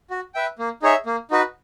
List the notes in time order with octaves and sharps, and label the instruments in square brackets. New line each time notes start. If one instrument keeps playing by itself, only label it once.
[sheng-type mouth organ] F#4
B4 E5 G5
A#3
D#4 G#4 C#5 E5
A#3
D#4 F#4 B4